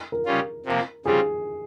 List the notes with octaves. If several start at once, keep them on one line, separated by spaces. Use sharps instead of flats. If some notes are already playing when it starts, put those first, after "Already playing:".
A#4
C#3 G3 C#4 F4
C3 F3 A#3
C#3 G3 C4 F4 G#4